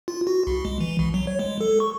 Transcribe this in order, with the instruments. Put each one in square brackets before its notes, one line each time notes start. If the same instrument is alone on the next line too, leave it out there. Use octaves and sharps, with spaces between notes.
[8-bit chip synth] F4
F#4
C2
G#3
E3
C2
F#3
C#5
G#3
A4
C#6